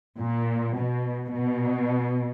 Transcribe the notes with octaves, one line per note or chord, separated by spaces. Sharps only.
A#2
B2
B2